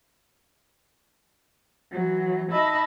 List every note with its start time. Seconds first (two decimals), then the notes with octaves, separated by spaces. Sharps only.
1.92 E3 F#3
2.51 D#4 D#5 E5 A5 B5